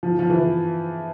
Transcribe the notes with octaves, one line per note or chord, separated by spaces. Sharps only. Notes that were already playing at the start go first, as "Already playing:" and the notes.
F3
F3
E3